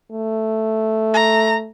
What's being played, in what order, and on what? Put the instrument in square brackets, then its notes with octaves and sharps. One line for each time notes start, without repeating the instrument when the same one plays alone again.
[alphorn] A3
[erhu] A#5